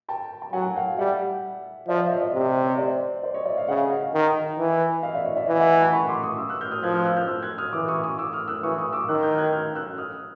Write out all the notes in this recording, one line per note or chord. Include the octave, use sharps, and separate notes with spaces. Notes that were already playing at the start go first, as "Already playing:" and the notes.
G5 A5
A5
F#3 F#5 G#5
F5 G5
G3 E5 F#5
F3 D5 E5
D5 E5
C#5 D#5
D5 E5
C3
C#5 D#5
C5 D5
C5 D5
C#5 D#5
D5 E5
D#5 F5
C#3 E5 F#5
D#5 F5
D#3
E3
D#5 F5
D5 E5
C#5 D#5
D5 E5
E3 D#5 F5
E5 F#5
E5 F#5
A5 B5
B5 C#6
C6 D6
C#6 D#6
D6 E6
E6 F#6
F6 G6
D#6 F6
F3 F#6 G#6
F6 G6
E6 F#6
F6 G6
E6 F#6
F#6 G#6
D#6 F6
E3 D6 E6
C#6 D#6
C#6 D#6
D6 E6
D#6 F6
E6 F#6
E3 C#6 D#6
C#6 D#6
D6 E6
D#3 E6 F#6
F6 G6
F#6 G#6
F6 G6
E6 F#6
D#6 F6